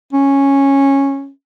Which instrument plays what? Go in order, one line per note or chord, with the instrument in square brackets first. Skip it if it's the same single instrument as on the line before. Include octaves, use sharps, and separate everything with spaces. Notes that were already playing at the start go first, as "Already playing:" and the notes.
[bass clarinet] C#4